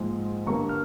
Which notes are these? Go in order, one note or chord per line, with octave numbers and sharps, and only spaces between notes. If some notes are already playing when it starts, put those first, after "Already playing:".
Already playing: A#1 G#2 F3 G#3
G1 G2 G3 A#3 A#5 C#6
F6